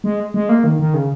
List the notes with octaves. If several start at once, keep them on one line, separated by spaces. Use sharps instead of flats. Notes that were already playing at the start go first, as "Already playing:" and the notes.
G#3
G#3
A#3
D#3
D#3
C#3